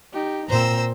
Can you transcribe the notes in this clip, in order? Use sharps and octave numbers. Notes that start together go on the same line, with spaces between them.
D#4 G4
A#2 C4 C5 A#5 E6